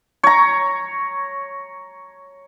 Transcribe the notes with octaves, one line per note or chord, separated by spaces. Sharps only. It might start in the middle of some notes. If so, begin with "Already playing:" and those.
C#5 A#5